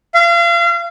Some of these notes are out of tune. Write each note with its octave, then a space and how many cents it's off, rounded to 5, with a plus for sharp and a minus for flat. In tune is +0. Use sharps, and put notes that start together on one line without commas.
F5 -35